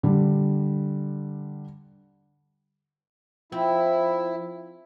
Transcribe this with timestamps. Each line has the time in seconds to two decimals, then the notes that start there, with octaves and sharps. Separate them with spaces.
0.03 D3 G3
3.52 F3 C4 E4